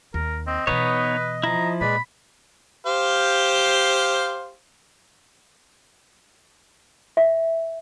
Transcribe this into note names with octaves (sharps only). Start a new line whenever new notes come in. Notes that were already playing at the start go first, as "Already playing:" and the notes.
D#2 A#4
C4 D#5
B2 E3 B3 D#4 B4 C#5
F3 E4 A#5
A#2 G#3 B4 D5 B5
G4 C5 F5
E5